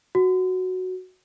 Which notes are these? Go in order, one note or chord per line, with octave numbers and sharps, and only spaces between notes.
F#4